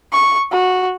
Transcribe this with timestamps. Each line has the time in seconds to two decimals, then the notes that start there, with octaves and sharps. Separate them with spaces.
0.12 C#6
0.52 F#4